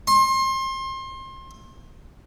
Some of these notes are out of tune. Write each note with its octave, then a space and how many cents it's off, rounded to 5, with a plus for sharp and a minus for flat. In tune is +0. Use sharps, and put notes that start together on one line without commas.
C6 +30